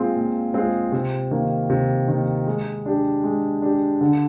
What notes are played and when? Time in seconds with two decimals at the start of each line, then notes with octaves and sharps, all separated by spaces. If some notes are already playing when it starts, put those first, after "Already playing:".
Already playing: A#2 G#3 C4 F4 G#4
0.15 A#2
0.54 G#3 C4 F4 G#4
0.92 C3
1.31 D#3 A#3
1.70 C3
2.08 D#3 A#3
2.47 G#3
2.86 D4 G4
3.24 G#3
3.62 D4 G4
4.01 D3